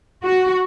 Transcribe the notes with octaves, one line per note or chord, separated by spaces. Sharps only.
F#4